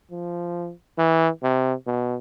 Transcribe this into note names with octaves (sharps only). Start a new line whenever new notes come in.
F3
E3
C3
B2